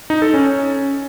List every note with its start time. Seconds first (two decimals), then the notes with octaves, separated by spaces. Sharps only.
0.10 D#4
0.22 A4
0.34 C#4